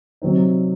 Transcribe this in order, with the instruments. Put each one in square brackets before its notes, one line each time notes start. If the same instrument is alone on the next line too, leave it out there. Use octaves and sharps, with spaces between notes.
[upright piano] C3 F#3 C4 D#4